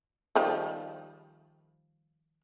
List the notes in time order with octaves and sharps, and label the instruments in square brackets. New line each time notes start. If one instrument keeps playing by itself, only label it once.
[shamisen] D#3 F3 G3